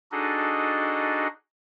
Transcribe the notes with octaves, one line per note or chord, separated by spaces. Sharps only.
D4 D#4 F#4 G#4 A4 D#5